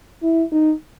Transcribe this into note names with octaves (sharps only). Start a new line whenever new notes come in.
E4
D#4